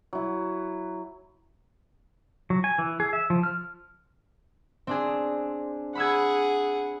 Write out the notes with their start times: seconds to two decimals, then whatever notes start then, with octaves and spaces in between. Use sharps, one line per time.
0.13 F#3 E4
2.50 F#3
2.64 G#5
2.78 E3
3.00 G#4
3.13 E5
3.30 F3
3.43 F6
4.87 C4 D4 G#4
5.95 G#4 F#5 B5 E6 G#6